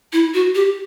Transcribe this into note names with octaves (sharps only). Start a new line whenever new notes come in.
E4
F#4
G4